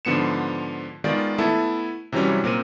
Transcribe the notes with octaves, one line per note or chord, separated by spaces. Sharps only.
G#2 D3 F3 B3 C#7 E7
D#3 G#3 B3 F4 D5
A3 B3 E4 A4
C3 E3 F#3 G3 C#4
A#2 C4 A#4 D#7